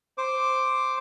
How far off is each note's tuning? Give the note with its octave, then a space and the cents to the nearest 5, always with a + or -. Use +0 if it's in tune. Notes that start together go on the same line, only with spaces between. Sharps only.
C5 +0 D6 +0